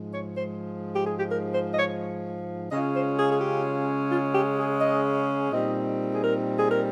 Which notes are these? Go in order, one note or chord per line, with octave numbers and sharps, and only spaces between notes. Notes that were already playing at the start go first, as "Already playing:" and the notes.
Already playing: G#2 F3 G#3
C#5
C5
G4
G#4
G4
A#4
C5
D#5
C#5
C#3 G#3 C#4 F4 D#5
C5
G#4
G#4
G4
F4
G4
G#4
D#5
A#2 G3 C4 D#4 D#5
G#4
A#4
G#4
A#4